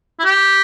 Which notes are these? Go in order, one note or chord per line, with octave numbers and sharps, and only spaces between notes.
E4
G4